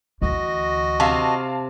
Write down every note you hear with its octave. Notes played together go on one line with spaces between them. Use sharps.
D2 E3 F#4 D#5
C3 F5 A5